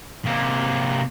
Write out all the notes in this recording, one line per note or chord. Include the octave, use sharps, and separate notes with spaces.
C3 A#3